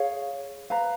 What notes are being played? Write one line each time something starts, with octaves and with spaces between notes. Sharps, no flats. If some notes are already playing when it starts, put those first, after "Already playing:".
Already playing: G#4 C#5 F5
B4 F5 A#5